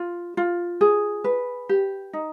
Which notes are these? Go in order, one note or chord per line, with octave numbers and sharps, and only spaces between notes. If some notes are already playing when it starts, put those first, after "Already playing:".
Already playing: F4
F4
G#4
B4
G4
D#4